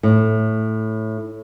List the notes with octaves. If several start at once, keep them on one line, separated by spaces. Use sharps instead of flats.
A2